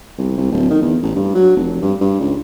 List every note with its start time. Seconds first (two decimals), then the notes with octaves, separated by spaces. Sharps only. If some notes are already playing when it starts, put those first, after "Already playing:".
0.18 C2
0.38 C2
0.51 D1
0.70 D#3
0.82 E2
1.02 A1
1.16 G2
1.35 F#3
1.57 F1
1.82 G2
2.01 G2
2.20 C#2